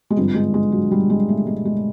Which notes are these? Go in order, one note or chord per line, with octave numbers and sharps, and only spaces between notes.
G#3
G#1 G2 D3 F3 G3
G#3
G#3
F#3
G3
G#3
A3
G#3
G#3